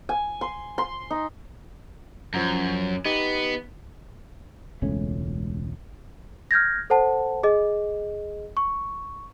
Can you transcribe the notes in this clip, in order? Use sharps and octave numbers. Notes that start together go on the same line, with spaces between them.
G#5
C6
C6
D#4
F#2 F3 F#5 A#5
B3 D#4 G4 D#5
E1 C#2 A3 C#4
F6 G6 G#6 A#6
A4 C5 F#5 A5
G#4 D#5
C#6